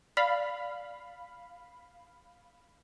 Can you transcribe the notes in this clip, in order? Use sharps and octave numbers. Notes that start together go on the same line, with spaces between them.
D5 F5 B5